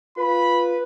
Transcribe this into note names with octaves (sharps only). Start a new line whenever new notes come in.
F4 B4 B5